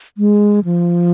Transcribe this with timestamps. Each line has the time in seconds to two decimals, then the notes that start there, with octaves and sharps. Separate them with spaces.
0.18 G#3
0.65 F3